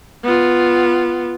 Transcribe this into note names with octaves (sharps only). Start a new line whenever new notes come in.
B3 F4